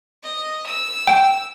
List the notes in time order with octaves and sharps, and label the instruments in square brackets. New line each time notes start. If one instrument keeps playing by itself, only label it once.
[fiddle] D#5
E6
[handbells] G5